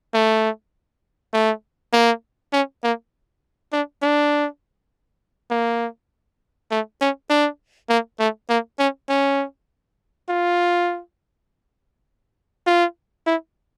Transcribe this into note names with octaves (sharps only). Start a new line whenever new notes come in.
A3
A3
A#3
C#4
A#3
D4
D4
A#3
A3
C#4
D4
A#3
A3
A#3
C#4
C#4
F4
F4
E4